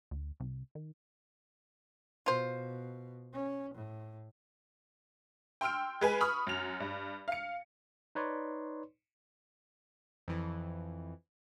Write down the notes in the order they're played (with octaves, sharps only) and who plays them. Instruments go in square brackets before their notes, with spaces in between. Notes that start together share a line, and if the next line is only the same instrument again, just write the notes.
[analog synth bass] D2
C2
D#3
[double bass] B2 [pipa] F4 C5
[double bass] C#4
A2
[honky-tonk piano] G5 C6 E6 F6 D7
G#3 B4 G#5
B5 C#6 D#6 F6
F#2 F7
G2
F5 C#7
[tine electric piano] D#4 B4 C#5 D5 C6
[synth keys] F2 E3